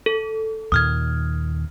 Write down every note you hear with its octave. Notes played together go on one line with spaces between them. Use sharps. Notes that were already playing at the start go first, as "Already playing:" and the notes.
A4
D#2 A#2 D#3 D#6 F6 G#6